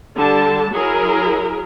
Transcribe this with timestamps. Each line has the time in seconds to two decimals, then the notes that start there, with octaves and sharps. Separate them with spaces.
0.14 D3 G3 A5
0.73 F#3 E4 G#4 A#4